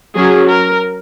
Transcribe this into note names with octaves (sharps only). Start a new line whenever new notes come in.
F#3 C#4 G#4
A#4